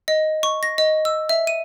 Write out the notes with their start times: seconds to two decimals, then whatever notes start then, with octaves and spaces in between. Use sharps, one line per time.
0.08 D#5
0.43 C#6
0.63 A#6
0.78 D#5
1.05 E6
1.29 E5
1.47 D#7